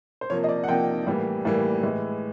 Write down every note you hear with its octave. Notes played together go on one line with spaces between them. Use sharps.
C5
C3 F3 A#3 C#5
D#5
D5
F#5
C3 F3 A#3 G5
A2 E3 G3 A#3
A2 E3 G3 A#3
A2 E3 G#3